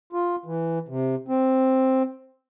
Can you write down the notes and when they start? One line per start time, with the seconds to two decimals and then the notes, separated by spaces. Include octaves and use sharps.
0.13 F4
0.46 E3
0.88 C3
1.28 C4